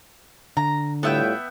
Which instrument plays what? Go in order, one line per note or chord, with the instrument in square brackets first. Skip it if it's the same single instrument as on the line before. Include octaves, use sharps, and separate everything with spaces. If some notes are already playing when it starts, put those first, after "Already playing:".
[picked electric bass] D3 [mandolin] A#5
[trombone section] A2 G3 F4 [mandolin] B3 E5 G5